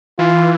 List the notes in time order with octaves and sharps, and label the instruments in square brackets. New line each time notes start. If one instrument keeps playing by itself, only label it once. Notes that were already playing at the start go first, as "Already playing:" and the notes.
[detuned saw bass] E3 [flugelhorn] F4